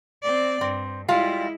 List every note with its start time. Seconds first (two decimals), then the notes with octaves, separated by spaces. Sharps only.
0.23 C4 D5
0.61 G2 C4
1.08 G3 G#3 E4 F4 F5